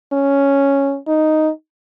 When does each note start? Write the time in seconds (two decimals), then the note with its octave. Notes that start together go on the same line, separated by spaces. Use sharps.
0.13 C#4
1.07 D#4